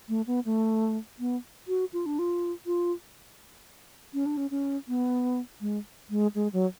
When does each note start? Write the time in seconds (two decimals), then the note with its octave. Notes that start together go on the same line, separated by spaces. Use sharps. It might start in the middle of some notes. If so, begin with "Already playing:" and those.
0.09 A3
0.27 B3
0.45 A3
1.19 B3
1.68 F#4
1.93 F4
2.06 D4
2.19 F4
2.66 F4
4.14 C#4
4.26 D4
4.37 C#4
4.51 C#4
4.88 B3
5.61 G#3
6.10 G#3
6.35 G#3
6.53 F#3